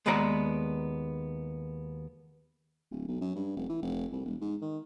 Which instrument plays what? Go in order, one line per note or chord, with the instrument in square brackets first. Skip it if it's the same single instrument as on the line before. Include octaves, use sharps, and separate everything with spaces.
[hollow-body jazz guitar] D#2 G#3 B3 B4 D5 A#5
[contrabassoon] D1
B1
F#2
G2
F1
E3
F1
C2
E1
G#2
D#3